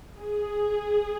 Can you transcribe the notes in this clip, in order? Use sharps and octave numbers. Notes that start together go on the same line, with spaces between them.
G#4